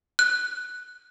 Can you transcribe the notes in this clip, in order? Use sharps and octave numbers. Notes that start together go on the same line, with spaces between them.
F#6